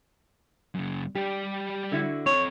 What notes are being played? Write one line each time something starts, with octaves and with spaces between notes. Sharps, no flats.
F#2 C#3
G3 G4 D5
D3 E4 F#4
C4 A4 C#5